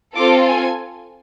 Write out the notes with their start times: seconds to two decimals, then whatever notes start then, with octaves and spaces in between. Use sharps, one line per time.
0.16 C4 F4 A4 D6
0.46 G#5